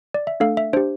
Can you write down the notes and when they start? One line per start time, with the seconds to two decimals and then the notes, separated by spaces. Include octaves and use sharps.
0.14 D5
0.27 E5
0.40 A3 D4 A4 F5
0.57 E5
0.73 D4 C5
0.77 G4